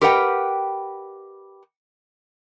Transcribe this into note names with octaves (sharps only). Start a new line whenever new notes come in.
G4 A#4 B4 D#5 F#5 G5